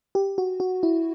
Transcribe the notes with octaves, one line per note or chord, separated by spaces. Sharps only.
G4
F#4
F#4
E4